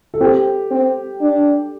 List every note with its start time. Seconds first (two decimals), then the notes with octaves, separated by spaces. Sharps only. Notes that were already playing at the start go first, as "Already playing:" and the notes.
0.14 A4
0.20 C4 G4
0.71 C4
1.20 D4